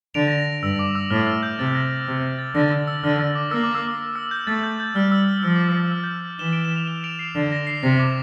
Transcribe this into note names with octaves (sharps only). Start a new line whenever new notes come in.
D3 D7 F7
A#6 D7
A#6
G2 E6
D6
E6
A2 F6
F6
G6
C3 A6
A#6
A#6
C3 A#6
A#6
A6
D3 A#6
E6
E6
D3 F6
E6
D6
A#3 E6
D6
E6
D6
E6
G6
A3 A6
G6
G6
G3 F6
E6
F3 E6
D6
E6
E6
F6
G6
E3 E7 G7
D7
E7
F7
E7 G7
D7 F7
C7 E7
D3 C7
A#6
C7
C3 A#6
D6